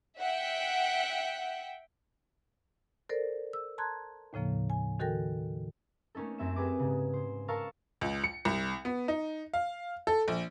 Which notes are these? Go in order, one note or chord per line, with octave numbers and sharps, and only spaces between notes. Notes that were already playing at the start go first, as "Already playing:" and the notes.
E5 F#5 G5
A4 A#4 C5 D5
E6
A5 A#5 C6 F#6 G#6
D#2 A2 C#3 F3 A#3
G#5
D#3 F#4 A4 A#4 G5 A#6
A3 A#3 C#4 D#4 A4
F#2 C4 E5 E7
G4 G#4 B4 D6
G#2 C#3
C5
A#4 F5 A5 C#6 E6
C#2
C#7
C2
B3
D#4
F5
A4
A#1